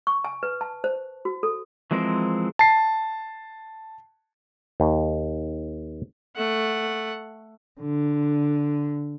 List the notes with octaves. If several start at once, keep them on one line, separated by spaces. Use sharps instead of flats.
C#6
G#5
B4
A5
C5
F#4
A4
E3 F3 G#3 C4 A#4
A5 C7
D#2
A3 F#5
D3